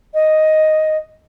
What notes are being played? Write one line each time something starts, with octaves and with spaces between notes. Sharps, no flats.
D#5